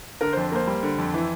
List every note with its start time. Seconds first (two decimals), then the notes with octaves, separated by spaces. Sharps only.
0.21 D3 A#4
0.33 F2 C5
0.52 A#3 C5
0.67 G3
0.83 D3
0.98 F2
1.14 E3